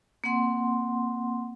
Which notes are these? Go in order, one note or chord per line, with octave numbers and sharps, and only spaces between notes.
A#3 C4 F#5 C6